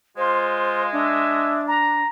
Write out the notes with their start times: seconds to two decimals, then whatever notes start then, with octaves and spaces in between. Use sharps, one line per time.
0.17 G#3 F4 C5
0.92 D4 E5
1.68 A#5